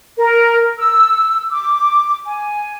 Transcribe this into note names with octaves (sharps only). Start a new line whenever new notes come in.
A#4
E6
D6
G#5